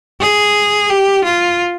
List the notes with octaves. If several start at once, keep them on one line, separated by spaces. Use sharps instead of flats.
G#4
G4
F4